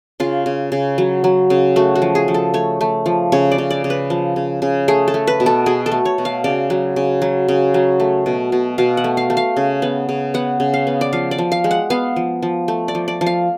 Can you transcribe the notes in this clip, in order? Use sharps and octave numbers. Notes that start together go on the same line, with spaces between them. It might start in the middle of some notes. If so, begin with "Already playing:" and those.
C#3 F4
C#3
C#3
F#3
F#3
C#3
A3 F#4
F#4
F3
G#4
F3
A4
A3 C#5
A3
F3
C#3 C#5
D5
C#3
D5
C#3
B4
F3
C#3
C#3
A3 G#4
A4
A3
B4
B2
A4
B2 G#4
A4
A3
C#5
B2
F5
C#3 D5
F#3
C#3
F#3
C#3
F#3
A3
B2
B2
B2 F5
F#5
A3
F5
A3
F5
C#3
B3
C#3
B3 F#5
C#3
F5
B3
D5
F3 F5
D5
F3
F5
G#3
F#5
B3 F5
F3
F3
A3
D5
F3
D5
F3
F5